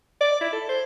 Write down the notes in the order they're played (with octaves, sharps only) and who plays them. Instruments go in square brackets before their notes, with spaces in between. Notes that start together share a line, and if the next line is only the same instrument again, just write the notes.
[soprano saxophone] D5
E4
A4
C5